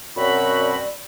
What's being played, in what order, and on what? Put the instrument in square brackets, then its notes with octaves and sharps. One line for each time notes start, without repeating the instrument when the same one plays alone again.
[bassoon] F#2 [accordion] B2 C4 F#4 [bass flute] D5 [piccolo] B5